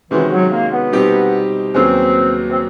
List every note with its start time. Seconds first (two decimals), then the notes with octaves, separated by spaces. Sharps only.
0.11 C3 D#3 E3 G#3 C#4 F#4
0.31 F#3
0.51 A#3
0.72 B3
0.92 B2 G3 C4 D#4 G4
1.74 D#2 C#3 F#3 B3 C4
2.50 C4